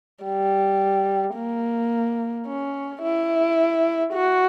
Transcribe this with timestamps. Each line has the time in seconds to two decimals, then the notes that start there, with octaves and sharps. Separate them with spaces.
0.24 G3
1.35 A#3
2.47 C#4
3.03 E4
4.15 F#4